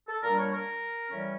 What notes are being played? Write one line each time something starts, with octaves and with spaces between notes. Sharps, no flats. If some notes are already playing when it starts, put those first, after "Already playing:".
A4
A#2 G3 D4 A#4
C#5
A#4
A2 E3 G3 C#4